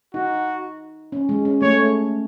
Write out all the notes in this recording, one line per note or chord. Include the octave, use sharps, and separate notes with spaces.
D#4 F#4
C#4
G#3
C#4
A3 C#5